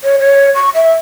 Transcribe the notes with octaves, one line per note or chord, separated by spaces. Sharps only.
C#5
C#5
C#6
E5